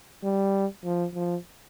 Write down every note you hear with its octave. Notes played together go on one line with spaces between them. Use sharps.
G3
F3
F3